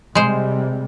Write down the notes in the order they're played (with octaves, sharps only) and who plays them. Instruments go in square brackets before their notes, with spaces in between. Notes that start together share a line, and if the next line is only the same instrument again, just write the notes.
[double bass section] C3 G3 [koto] G#3 C5